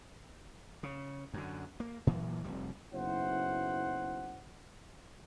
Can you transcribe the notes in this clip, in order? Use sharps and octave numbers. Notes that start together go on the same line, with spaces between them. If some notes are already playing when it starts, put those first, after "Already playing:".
C#3
F#2 D3
A#3
A#2 E3 F#3 A#3
F1 F2 G3
F#1 B1 E4 C5 F#5